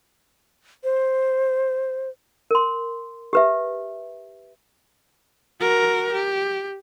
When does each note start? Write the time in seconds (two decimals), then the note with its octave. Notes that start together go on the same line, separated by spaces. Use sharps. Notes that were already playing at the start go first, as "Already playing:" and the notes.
0.84 C5
2.51 A#4 C6
3.33 G4 B4 E5
5.60 F#4 A#4
6.12 G4